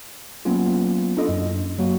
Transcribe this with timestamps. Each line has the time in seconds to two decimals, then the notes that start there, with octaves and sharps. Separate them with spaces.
0.45 F#3 A#3 B3 C#4 F4
1.17 D4 E4 F4 A4 D#5
1.29 F#2
1.79 F#3 A#3 F#4